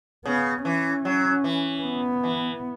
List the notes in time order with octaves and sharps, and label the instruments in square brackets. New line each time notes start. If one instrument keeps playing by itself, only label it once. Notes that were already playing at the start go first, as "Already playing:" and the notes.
[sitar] C#3 [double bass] B3
[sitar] E3 [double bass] C#4
[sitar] F#3
E3
[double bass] B3
[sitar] E3